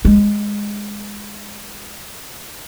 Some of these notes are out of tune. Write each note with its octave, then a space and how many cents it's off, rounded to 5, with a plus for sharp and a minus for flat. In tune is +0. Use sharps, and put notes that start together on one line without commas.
G#3 -10